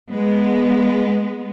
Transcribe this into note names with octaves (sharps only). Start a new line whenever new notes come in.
G#3 B3